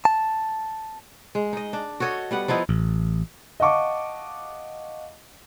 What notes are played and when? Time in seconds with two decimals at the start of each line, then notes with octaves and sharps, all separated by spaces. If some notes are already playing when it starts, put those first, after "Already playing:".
0.05 A5
1.35 G#3
1.53 D#4 D#5
1.73 D4
2.00 F#4 A4 C#5 D#5
2.31 G3 B3 F#5
2.48 F3 B3 D#4 E4
2.69 A1
3.60 D#5 F5 F#5 A5 C#6 D6